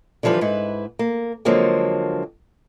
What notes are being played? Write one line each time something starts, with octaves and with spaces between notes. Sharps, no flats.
D3 E3 F3 G3 B4
G#2 E4 B4
A#3
D3 F3 F#3 G#3 A#3 C4